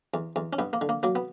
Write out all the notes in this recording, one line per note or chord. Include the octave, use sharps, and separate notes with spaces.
E2
E2
C#4
G2 B3
A#3
D3
A#3
F#3 A#3
B3